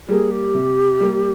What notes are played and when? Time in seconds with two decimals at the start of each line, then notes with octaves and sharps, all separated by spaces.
0.08 G3 A#3 G#4
0.31 G4
0.54 C3
1.00 G3 A#3